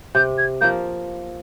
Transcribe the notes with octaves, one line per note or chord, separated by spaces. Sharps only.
C3 G6
G#6
F3 A#3 G6